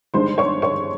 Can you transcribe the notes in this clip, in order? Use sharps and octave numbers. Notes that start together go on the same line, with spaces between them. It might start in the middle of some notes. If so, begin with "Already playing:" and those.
G1 G2 D#3 G#3 C5 C6
C#5 C#6
C#5 C#6